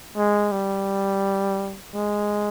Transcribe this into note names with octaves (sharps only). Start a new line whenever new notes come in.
G#3
G3
G#3